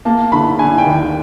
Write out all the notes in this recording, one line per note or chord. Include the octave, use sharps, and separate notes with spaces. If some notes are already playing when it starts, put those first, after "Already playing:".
A#3 A5
D3 B5
D3 G#5
G5
D#2